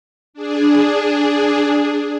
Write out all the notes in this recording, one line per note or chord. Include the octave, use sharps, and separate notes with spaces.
D4 G#4